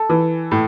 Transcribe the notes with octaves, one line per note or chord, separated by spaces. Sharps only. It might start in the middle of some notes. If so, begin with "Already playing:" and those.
Already playing: A4
E3
A2